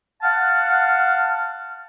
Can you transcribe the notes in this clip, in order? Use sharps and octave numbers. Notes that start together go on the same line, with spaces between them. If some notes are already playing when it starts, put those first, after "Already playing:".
F5 F#5 A5 F6